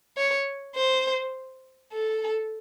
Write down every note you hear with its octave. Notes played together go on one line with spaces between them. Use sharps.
C#5
C5
A4